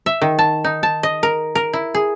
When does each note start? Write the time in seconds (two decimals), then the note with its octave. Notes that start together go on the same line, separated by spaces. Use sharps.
0.06 E5
0.21 D#3
0.39 A5
0.64 D#4
0.83 A5
1.03 D#5
1.23 A#4
1.55 A#4
1.73 E4
1.94 G#4